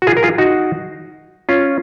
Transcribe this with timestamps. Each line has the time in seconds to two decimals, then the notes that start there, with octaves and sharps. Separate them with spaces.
0.02 F#4
0.07 F4 G#4
0.17 A#4
0.23 F4 G#4
0.38 D#4 F#4
1.49 C#4 F4